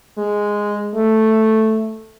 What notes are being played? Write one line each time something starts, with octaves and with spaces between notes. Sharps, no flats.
G#3
A3